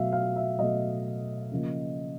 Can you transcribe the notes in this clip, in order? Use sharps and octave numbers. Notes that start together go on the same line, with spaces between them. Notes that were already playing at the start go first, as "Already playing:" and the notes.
Already playing: B2 F#3 A3 E5 F5
F5
E5
B2 F#3 A3 D#5
C#3 F3 A#3